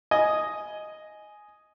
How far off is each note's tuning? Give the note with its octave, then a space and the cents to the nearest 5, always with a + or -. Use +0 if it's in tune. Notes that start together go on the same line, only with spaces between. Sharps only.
D#5 +0 G#5 +10